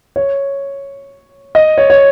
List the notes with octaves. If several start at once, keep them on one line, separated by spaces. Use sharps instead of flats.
C#5
D#5
C#5
C#5